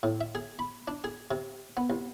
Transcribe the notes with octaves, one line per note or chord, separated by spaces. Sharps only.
A2
E5
G#4
B5
D4
G#4
C3
B3
C2